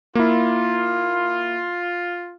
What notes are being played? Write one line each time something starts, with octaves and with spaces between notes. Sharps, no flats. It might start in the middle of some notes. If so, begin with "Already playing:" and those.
A#3 E4 F4